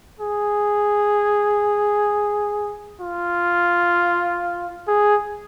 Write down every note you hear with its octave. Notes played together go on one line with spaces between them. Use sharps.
G#4
F4
G#4